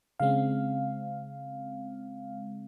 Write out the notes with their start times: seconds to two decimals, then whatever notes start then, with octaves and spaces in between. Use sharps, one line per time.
0.20 C#3 G#3 C4 F5